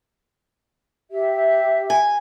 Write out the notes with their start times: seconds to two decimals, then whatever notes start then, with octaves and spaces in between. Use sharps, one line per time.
1.11 G4 E5
1.90 G#5